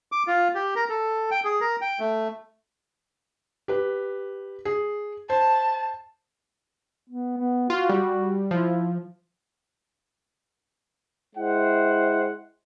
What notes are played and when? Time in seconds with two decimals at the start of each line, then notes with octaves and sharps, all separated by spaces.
0.12 D6
0.27 F4
0.55 G4
0.75 A#4
0.89 A4
1.31 G5
1.44 G#4
1.61 A#4
1.81 G5
2.00 A3
3.68 G4 B4
4.65 G#4
5.30 C5 A5
7.09 B3
7.38 B3
7.70 F4 F#4
7.90 G3
8.51 F3 E4
11.36 G#3 E4 C5 F#5 G5